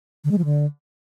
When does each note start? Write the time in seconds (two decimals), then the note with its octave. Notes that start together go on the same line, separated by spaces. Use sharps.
0.24 D3
0.31 G#3
0.38 F3
0.45 D3